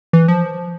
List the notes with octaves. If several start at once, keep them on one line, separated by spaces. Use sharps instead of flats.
E3
F3